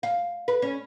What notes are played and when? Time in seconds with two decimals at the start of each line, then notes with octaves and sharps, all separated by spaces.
0.03 F5
0.48 B4
0.62 C#4